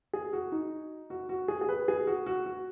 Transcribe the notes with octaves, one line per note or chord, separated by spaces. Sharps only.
G#4
F#4
D#4
F#4
F#4
G#4
G#4
B4
G#4
F#4
F#4
F#4